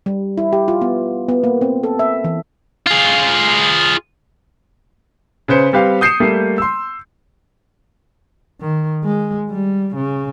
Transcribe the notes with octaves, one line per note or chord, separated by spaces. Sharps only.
G3
E4
G4
F4
B3
B3
A#3
C4
A4
E5
E3
F4 G#4
C#3 B4 C5 C#7
G3 C4 G4 B4 F5
D#6 G6 C7 C#7 D#7 E7
G3 A3 A#3
C6 E6
D#3
G#3
G3
C#3